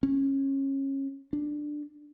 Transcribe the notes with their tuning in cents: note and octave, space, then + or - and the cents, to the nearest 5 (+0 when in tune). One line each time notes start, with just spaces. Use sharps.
C#4 -25
D4 +10